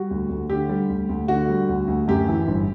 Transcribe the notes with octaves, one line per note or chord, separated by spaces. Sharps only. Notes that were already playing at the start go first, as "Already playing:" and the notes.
Already playing: G3 F#4
D2
D2
D3 G4
G3
D2
D2
D3 F#4
G3
D2
D2
F#2 G4
E3
G1